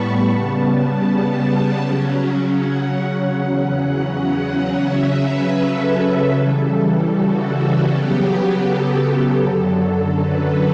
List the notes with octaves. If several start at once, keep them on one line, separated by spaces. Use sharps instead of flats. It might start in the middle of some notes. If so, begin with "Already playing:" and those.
Already playing: A2 G3 B3 A5 B5 C#6
C#3 G3 B3
C#3 F#3 C#4
F#5
E2 C#3 F#3 C#4
C#3 F#3 C#4 E5
B4
A4
C#3 E3 G3
F#4
C#3 F#3 B3 G4
A4
F#2 D3 F#3
B4